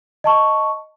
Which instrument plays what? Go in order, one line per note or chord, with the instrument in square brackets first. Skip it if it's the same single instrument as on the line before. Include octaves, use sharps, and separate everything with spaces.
[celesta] D#5 A5 C#6